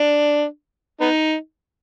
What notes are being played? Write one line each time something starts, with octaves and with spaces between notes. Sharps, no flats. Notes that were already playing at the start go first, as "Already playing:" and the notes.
Already playing: D4
B3 D#4